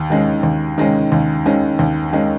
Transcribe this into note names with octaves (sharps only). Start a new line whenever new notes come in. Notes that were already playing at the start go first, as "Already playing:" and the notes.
Already playing: D#2
D#3 G#3 C#4
D#2
D#3 G#3 C#4
D#2
D#3 G#3 C#4
D#2
D#3 G#3 C#4